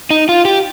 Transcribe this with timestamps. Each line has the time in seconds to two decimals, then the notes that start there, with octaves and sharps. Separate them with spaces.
0.11 D#4
0.29 F4
0.45 G4